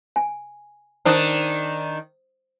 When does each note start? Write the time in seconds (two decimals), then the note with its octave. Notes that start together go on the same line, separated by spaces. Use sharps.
0.16 G#5
1.05 D#3 D4 C5 D#6